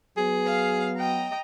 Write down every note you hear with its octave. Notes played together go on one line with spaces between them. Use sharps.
F#3 B3 G#4
F5
D#5 G5 A#5